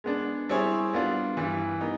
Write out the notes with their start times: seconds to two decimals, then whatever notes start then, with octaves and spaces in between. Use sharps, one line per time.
0.04 G#3 B3 D4
0.49 G3 C4 E4 G#4 C#5
0.93 G3 B3 D4 F4
1.37 G2 E3 G3
1.81 B3 D#4